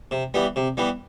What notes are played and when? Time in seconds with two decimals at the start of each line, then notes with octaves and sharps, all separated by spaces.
0.11 C3
0.34 E3 G3 B3
0.56 C3
0.77 E3 G3 B3